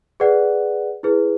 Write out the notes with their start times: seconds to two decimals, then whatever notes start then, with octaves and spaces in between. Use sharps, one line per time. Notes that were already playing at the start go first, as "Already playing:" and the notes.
0.20 G#4 B4 D5 F#5
1.03 E4 G#4 B4